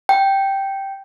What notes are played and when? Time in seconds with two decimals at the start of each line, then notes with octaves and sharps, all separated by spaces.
0.09 G5